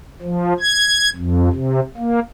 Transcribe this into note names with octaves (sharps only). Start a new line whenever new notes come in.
F3
G#6
F2
C3
A#3